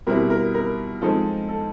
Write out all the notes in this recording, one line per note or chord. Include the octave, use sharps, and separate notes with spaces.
B2 G3 C4 E4 A#4
A#4
A#4
F3 G#3 C4 D#4 A4
A4